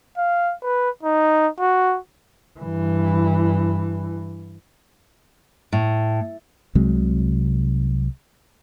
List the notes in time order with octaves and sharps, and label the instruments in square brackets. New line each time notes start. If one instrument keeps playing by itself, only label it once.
[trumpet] F5
B4
D#4
F#4
[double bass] G2 E3
[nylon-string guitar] A2
[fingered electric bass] C2 C3 F#3 G#3